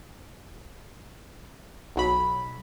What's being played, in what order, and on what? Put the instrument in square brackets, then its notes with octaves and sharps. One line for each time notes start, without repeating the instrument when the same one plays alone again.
[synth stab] B1 F#3 B5